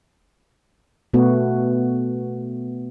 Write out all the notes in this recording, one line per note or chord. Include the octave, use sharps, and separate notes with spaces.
B2 A3 B3 F#4